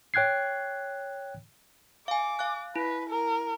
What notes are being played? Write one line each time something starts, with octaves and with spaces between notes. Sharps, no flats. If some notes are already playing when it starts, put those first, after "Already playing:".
C#5 G5 F#6 G#6 C7
F5 G#5 D6
F5 F#6
E4 B4
A#4